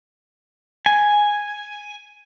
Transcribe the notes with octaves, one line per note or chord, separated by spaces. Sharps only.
G#5